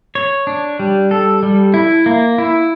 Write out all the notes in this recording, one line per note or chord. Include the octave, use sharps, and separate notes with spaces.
C#5
D4
G3
A4
G3
E4
A#3
E4